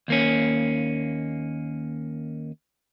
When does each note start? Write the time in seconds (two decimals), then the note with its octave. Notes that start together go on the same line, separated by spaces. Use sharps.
0.08 D#2 A#3 C#4